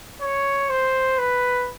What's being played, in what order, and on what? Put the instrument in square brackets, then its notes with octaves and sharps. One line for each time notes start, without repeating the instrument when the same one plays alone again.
[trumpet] C#5
C5
B4